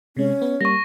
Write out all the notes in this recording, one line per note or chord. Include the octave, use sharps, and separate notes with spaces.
C3 G#3 C#4
B3
G3 A#3 C#6 A#6